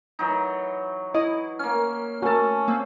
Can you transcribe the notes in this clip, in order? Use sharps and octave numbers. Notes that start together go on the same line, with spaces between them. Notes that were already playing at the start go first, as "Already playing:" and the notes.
E3 F#3 D#4
E4 D#5 D#6
A#3 C#4 F6
A3 C#4 F#4 A#4 A5
C3 A#3